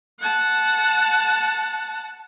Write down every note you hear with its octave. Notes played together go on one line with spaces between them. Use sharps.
F#5 A5